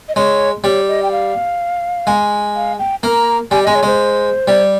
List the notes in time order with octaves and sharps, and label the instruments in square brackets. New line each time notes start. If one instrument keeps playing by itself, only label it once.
[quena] D#5
[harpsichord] G#3 [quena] C#5
[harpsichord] G3 [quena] C#5
[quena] D#5
G5
F5
[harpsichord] G#3
[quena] F5
G5
[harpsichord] A#3 [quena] A#5
[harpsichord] G3 [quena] G#5
[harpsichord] G#3 [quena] D#5
[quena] C#5
[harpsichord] G#3 [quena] C5
[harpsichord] G3